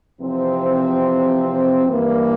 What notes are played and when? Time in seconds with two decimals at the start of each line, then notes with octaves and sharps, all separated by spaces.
0.20 E2 C3 F3 C4
1.86 G2 E3 A#3